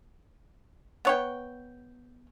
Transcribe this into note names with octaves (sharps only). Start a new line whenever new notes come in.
B3 C#5 G5